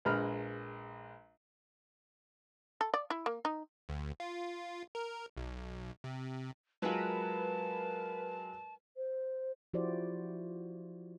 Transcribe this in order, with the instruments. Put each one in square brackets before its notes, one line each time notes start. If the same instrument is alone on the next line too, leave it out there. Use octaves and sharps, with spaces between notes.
[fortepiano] A#1 G#3 B4 A#5 B5 F6
[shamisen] A4
D5
E4
A#3
D#4
[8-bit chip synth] D2
F4
A#4
B1
C3
[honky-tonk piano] F#3 G#3 F4 [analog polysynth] A#4 B4 [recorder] A5
[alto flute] C5
[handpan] F3 E4 F#4 G4 C5 D5